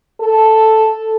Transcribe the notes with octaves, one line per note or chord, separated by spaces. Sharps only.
A4